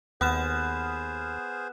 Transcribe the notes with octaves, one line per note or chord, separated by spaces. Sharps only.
D#2 B3 G#4 C5 F#5 F6 E7